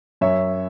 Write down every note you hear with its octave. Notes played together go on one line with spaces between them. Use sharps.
F#2 C#5 E5